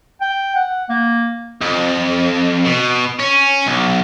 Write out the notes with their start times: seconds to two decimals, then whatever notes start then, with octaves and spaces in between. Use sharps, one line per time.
0.21 G5
0.55 F#5
0.90 A#3
1.61 F2
2.65 B2
3.19 C#4
3.66 B1